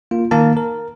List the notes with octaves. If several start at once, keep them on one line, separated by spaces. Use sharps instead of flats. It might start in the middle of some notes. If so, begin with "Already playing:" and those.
A#3 F4
D#3 A#3 A#4 A5
A#4